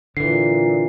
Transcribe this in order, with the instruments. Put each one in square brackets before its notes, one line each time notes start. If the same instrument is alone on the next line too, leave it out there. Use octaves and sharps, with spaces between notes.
[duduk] A#2 [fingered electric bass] D3 E3 [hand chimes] C7